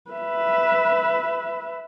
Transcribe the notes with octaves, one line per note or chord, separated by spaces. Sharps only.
B4 E5